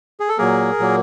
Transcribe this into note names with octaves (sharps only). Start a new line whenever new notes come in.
G#4
A4
A#2 F#3 A#3 G#4 A#4
A#2 F#3 A#3